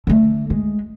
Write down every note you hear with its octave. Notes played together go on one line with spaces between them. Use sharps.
D3 A3
G#3